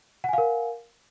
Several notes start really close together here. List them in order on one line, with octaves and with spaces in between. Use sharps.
F#5 G#5 F5 A#4